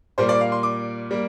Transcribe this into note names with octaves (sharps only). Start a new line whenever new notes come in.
A#2 G3 A#3 C5
D5
F5
C6
D6
G3 A#3